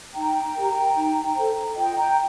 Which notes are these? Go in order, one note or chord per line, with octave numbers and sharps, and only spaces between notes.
D#4 G5 A#5
G4 A#4
D#4
A4 C5
F4 D#5 G5
G5 A#5